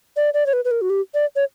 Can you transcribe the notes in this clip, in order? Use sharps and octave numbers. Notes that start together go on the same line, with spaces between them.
D5
D5
C#5
B4
B4
A#4
F#4
G4
D5
C#5